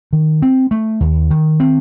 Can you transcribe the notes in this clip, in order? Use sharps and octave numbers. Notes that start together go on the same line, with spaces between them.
D#3
C4
A3
D#2
D#3
C4